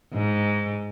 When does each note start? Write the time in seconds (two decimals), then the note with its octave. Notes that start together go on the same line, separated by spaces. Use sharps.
0.13 G#2